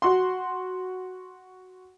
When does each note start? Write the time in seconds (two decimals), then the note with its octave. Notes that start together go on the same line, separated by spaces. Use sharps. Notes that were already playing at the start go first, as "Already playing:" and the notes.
0.02 F#4 C6